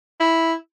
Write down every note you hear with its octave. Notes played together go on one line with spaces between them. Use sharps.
E4